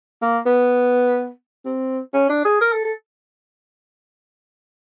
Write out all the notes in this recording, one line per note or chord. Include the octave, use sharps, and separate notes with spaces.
A#3
B3
C4
C#4
D4
G#4
A#4
A4
A4